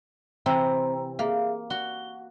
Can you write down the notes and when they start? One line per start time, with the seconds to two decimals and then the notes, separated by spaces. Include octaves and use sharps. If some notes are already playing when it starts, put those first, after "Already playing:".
0.46 C3 E3 C4 C5 A#5
1.19 A#3 G#4 E5 F5
1.70 F#4 G7